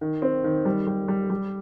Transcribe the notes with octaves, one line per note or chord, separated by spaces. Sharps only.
D#3
C4
D#3
G3
G3
G3
G3